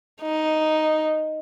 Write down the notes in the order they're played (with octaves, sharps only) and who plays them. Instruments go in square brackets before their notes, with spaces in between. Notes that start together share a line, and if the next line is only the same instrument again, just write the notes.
[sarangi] D#4